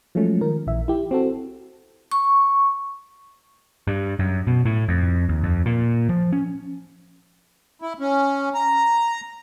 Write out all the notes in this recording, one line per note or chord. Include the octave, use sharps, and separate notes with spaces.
F3 F#3 G#3 A3 C#4
D#3 F3 A#4
A#1 E3 E5
E4 G4
C4 F#4 A4
C#6
G2
F#2
B2
A2
F2
D#2
F2
A#2
F3
C#4
E4
C#4
A#5